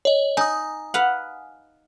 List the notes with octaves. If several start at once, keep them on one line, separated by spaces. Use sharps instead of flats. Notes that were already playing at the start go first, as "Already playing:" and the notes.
C#5 D#5
D#4 G#5 D#6
B4 F5 F#5